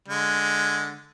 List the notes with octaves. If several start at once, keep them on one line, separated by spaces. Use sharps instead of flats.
D3 G#3